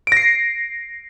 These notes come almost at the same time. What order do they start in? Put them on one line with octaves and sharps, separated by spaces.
D7 A#6 C7